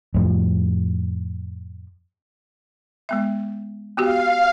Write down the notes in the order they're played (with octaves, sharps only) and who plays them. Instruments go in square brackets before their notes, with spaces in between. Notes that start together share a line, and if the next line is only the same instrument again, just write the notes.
[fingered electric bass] F2 A2 F3
[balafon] G#3 B3 E5
[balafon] B3 F#4 G4 [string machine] F5